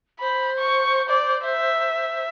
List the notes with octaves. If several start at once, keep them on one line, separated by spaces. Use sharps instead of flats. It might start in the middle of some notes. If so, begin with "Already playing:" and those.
C5 B5
C#6
D5
E5